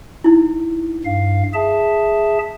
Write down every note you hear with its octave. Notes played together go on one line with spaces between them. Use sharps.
D#4 E4
G2 F5
G#4 E5 A5